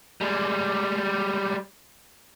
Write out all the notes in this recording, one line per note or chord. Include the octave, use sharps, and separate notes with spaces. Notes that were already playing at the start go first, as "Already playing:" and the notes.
G3 G#3